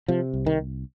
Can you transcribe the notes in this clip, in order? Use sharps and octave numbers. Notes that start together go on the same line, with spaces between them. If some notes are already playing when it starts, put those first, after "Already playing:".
C3 F3
C2
D#3